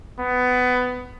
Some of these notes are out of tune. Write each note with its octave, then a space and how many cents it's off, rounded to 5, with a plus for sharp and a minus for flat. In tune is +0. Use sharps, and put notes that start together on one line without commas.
B3 +20